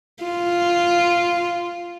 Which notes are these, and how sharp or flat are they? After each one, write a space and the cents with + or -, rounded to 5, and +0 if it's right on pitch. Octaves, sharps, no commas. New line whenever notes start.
F4 -5